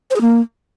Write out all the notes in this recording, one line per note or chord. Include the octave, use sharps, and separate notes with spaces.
C5
G#4
A#3